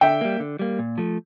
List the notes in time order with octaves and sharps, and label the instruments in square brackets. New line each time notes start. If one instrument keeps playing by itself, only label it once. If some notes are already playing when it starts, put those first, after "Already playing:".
[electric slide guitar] D3 [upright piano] E5 G5
[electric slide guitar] G3 A#3
D3
G3 A#3
A#2
F3 A3